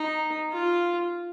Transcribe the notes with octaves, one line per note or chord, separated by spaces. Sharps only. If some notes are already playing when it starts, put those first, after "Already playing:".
Already playing: D#4
F4